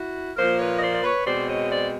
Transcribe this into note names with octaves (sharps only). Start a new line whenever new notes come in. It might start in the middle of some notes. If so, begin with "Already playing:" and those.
Already playing: E4 F#4
A#2 F3 A#3 A#4 C5
B4 C#5
D#5
C5 D5
D5
B4 C#5
B2 G#3 C4 C5 D5
C#5 D#5
C5 D5